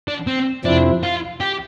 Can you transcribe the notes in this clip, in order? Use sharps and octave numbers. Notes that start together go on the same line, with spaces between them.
D4
C4
F2 C3 F3 C4 D4 E4
F4
G4